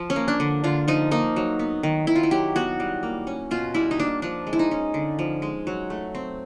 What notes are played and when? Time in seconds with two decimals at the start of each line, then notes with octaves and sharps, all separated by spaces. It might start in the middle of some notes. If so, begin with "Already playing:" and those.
Already playing: F3
0.10 C#4
0.16 A#3
0.28 D4
0.40 D3
0.64 D3 F4
0.88 F3 D#4
1.11 A#3 D#4
1.36 F#3
1.59 B3
1.83 D#3
2.07 D#3 E4
2.16 F4
2.23 E4
2.31 F#3 G4
2.56 B3 F#4
2.80 G3
3.03 A#3
3.27 C#4
3.51 B2 F4
3.74 G3 E4
3.91 D#4
4.00 A#3 D4
4.22 F3 D4
4.47 G#3
4.53 E4
4.59 D#4
4.71 C#4
4.94 D3
5.19 F3
5.42 G#3
5.67 F#3
5.90 A3
6.15 C4